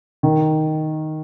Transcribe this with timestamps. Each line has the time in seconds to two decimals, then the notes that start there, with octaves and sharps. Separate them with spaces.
0.23 D#3